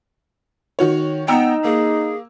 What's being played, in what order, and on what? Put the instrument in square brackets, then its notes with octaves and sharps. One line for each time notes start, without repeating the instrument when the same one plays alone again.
[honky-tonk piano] D#3 F#4 C#5
[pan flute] B3 [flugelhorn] D#4 [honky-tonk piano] G5 A#5 E6
[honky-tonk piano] A#3 [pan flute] G#4